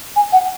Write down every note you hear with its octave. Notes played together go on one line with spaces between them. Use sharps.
G#5
F#5